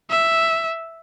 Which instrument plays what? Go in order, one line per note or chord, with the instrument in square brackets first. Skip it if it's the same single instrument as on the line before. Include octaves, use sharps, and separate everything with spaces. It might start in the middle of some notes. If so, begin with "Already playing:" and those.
[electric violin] E5